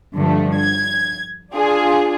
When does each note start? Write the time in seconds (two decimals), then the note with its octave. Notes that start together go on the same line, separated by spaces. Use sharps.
0.16 G2 D3 F3 A3
0.57 G#6
1.54 D4 F4 G#4